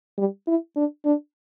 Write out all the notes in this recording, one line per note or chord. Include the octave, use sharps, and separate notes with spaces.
G3
E4
D4
D4